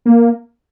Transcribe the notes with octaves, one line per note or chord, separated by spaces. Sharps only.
A#3